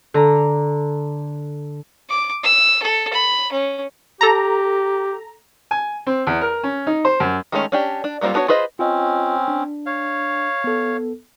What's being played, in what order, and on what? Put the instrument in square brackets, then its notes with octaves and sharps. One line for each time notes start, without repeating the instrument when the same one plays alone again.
[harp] D3 A#5 [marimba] A4
[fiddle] D6
E6
A4
B5
C#4
[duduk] G4 [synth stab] A4 A#5
[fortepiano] G#5
C4
E2
A#4
C#4
D#4
C5
F#2
[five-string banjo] D#3 G#3 A3 B3 C#4
C#4 D4 G4
D4
F#3 G3 A#3 C4 F4
B3 D4 F#4 B4 C#5
F4 G#4 B4 C5 D#5
[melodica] C4 C#4 [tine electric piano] F4 D#5
[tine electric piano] D4
[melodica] C#5 F5
[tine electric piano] B3 A4